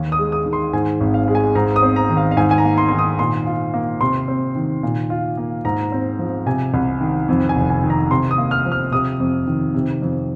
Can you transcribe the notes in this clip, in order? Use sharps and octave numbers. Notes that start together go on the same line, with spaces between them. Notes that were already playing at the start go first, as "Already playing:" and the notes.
Already playing: D#2
D#6
G#3
D#6
D#3
C6
G#2 G#5
G#1
F5
G#3
G#5
G#2 A#5
D#6
C4
A#5
D#3
F5
F5
G#2 G#5
G#5
A#5
A#3
C6
D#3 C6
D#6
A#2 C6
F4
A#3
C3 C6
C4
D#3
A#2
F4
A#3
G#2 A#5
C4
F3
C3 G#5
C2
D#3
F2
G#5
F1
G#5
D#3
A#5
C3 C6
D#6
A#3
F6
F3
F6
C3 D#6
F2
D#3
C3
F2